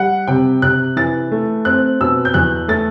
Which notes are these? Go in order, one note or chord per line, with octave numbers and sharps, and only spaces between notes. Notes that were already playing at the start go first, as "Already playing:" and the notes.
Already playing: G3 F#5
C3 G5
C3 F#6
E3 A6
A3
C4 F#6
B2 E6
G6
E2 F#6
A3 A6